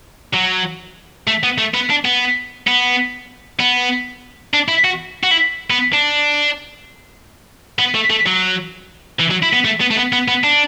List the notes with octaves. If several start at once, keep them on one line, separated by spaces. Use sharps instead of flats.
F#3
A3
B3
A3
B3
D4
B3
B3
B3
D4
E4
F#4
F#4
E4
B3
D4
B3
A3
A3
F#3
E3
F#3
E4
B3
A3
B3
A3
B3
B3
B3
D4